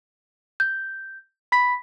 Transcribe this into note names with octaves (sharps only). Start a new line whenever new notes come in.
G6
B5 B6